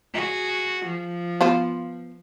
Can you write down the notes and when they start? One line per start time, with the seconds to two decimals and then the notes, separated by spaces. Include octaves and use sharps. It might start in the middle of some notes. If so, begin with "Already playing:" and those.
0.13 F#4 G#4
0.84 F3
1.41 B3 F4 C5